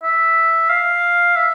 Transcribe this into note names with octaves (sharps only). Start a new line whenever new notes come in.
E5
F5
E5